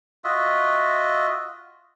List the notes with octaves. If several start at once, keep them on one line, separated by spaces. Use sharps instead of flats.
F4 F#4 D#5 E5